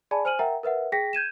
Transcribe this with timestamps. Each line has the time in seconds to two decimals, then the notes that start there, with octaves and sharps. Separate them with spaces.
0.11 G#4 D5 G#5 A5 B5
0.25 C5 G#5 F6 D#7 F#7
0.39 A#4 E5 F#5 G5 A#5
0.63 A#4 B4 E5 F#5
0.92 G#4 G5 A#6 B6
1.13 G6 G#6 D#7 E7